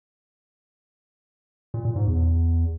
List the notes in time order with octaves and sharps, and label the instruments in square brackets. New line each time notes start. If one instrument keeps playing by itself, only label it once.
[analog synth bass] A#2
A#2
G#2
E2